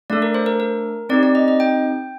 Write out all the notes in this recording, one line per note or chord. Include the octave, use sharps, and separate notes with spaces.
A3 D4 A4 D5
A#4
C5
A#4
A#4
C4 D#4 G4 D5
D5
D#5
D#5
G5